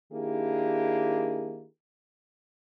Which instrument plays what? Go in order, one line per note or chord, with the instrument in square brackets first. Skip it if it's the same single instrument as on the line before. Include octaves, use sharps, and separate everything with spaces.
[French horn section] D#3 A#3 D4 E4 G4 G#4